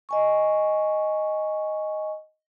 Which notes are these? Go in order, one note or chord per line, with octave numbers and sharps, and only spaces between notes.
D#5 G#5 C#6